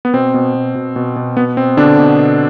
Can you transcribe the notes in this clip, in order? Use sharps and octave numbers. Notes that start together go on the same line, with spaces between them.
B3
B2 C4
B2
B2
B2
B2
B2
B2 B3
B2 C4
B2 D3 D4
B2
B2